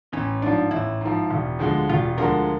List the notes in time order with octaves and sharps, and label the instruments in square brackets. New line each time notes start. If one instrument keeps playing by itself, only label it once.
[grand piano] A1 [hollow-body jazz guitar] C#4
[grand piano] G#2 F3 [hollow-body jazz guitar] D4
[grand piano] A1 [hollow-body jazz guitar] E4
[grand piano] G#2 F3
E1
D2 D3 F3 G#3
[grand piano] E1 [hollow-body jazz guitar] F4
[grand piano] D2 D3 F3 G#3 [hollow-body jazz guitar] A#4